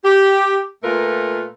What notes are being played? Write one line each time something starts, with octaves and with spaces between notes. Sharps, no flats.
G4
A#2 A3 F4 A#4 B4